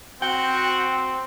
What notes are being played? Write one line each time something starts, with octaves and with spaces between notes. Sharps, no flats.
C4 F#4 G5